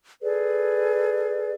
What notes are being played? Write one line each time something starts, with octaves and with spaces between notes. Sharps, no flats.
G#4 A4 B4 D5